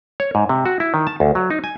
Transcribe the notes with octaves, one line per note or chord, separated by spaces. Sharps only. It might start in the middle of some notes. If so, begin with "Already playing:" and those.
C#5
G#2
C3
F#4
E4
D#3
A5
D2
F#3
D#4
G#5